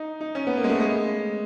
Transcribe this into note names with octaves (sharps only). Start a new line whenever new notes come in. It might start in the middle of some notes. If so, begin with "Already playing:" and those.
Already playing: D#4
D#4
C#4
B3
A#3
G#3
A3
G#3